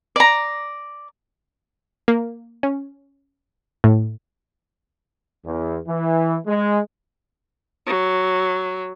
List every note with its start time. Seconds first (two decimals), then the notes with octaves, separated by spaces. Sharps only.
0.16 D5 A#5
2.08 A#3
2.63 C#4
3.84 A2
5.45 E2
5.88 E3
6.46 G#3
7.86 F#3